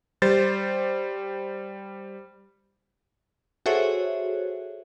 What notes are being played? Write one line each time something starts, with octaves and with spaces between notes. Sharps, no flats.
G3 C5 A6
F#4 G#4 A4 C5 C#5 E5